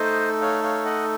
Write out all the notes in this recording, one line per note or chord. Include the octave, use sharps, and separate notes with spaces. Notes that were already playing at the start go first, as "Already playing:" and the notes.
Already playing: A3 D#4 A4 C5 D#5
C#5 F5
C#5 F5
D#5 F#5